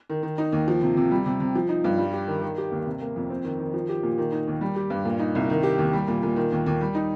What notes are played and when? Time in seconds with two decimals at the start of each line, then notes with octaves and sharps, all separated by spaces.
0.10 D#3
0.23 D#3
0.38 D#4
0.52 D#2
0.68 F3
0.82 C3
0.97 C3
1.11 G3
1.26 C3
1.40 C3
1.56 F3
1.69 D#4
1.84 G2
1.98 G3
2.13 G4
2.27 D#3
2.42 D#3
2.58 G4
2.71 D#2
2.86 C3
3.02 A#3
3.16 F2
3.30 C4
3.44 D#3
3.59 D#3
3.74 F3
3.89 G4
4.03 A#2
4.18 D#3
4.32 D#4
4.47 D#2
4.61 G3
4.76 G4
4.90 G2
5.05 A#2
5.20 D#4
5.35 C2
5.50 D#3
5.63 G4
5.78 D#2
5.93 G3
6.08 A#2
6.23 A#2
6.36 D#3
6.52 D#2
6.66 D#2
6.81 G3
6.95 D#4